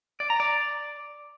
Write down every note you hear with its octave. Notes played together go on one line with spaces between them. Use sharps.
D5
A#5
D5